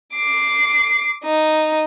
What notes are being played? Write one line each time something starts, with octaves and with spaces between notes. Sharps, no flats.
D6 C7
D#4